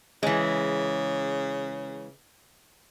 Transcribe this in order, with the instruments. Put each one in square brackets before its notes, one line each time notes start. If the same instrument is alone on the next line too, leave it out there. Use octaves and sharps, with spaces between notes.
[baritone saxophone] C#3 [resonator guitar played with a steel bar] E3 G#3